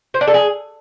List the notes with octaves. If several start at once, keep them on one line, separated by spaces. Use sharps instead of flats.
C5
D4
A4
G#4